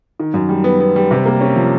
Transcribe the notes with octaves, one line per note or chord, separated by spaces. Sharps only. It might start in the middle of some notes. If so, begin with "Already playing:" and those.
D#3
F#2
G3
B3
B3
G3
C3
A#3
C#4
F3